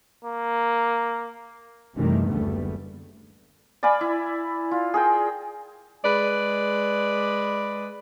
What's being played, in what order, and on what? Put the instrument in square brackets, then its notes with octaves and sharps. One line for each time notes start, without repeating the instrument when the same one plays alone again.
[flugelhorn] A#3
[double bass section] F#2 C3 D#3 E3 G3 A3
F#1 D2 D3 G3 A3 B3
[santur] D5 F5 G#5 B5
E4
F4
G#4 A#4 G5
[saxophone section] G#3 B4 D5